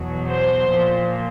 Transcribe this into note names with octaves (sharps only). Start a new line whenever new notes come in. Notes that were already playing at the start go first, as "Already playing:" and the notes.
Already playing: E2 B2 F#3
C5
A#2 F3